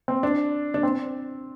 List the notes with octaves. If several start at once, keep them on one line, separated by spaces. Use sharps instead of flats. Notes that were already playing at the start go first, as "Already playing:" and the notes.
C4
D4
D4
C4